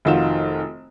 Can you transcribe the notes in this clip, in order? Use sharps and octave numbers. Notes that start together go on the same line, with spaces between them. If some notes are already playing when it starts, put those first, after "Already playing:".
F1 D#3 F4 F#4 E7